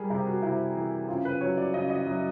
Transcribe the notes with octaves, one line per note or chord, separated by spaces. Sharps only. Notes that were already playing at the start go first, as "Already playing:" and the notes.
Already playing: G3 G#4 A#4
C3 G4
F#4
C3 E4
E3
C#3 F4
B4
F#3 C#5
D5
C#3 D#5
D#5
F#3 E5